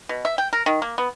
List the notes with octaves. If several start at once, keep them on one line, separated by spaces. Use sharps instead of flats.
B2
E5
G5
A#4
D#3
A#3
B3